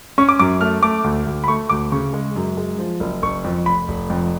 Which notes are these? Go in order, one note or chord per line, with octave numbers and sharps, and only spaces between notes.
C#4 C#6
D6
F#2 D6
A3 F6
A3 D6
D2
D2
B5
A3 C#6
D2 D6
C#3 C#6
G#3
F#2
G#3
F3
F#1
F#1 C#6
F2
F1 B5
F1
F2